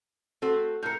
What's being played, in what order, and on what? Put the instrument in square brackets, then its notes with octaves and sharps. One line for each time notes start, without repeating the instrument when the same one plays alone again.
[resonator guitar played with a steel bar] A3 C4 F#4 [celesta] A4
[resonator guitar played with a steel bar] A2 A#4 [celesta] G6 C#7